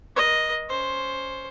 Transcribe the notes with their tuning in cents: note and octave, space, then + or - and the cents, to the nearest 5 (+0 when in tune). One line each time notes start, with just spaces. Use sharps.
A#4 +40 D#5 +0
C#4 +15 C5 +5